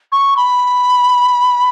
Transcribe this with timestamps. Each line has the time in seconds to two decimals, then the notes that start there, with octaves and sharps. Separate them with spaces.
0.12 C#6
0.37 B5